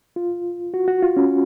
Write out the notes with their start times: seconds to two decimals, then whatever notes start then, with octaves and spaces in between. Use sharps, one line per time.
0.16 F4
0.74 F#4
0.88 F#4
1.02 F4
1.17 C#4